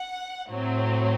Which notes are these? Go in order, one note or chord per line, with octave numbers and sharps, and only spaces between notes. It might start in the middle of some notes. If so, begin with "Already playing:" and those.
Already playing: F#5
A2 F#3 C4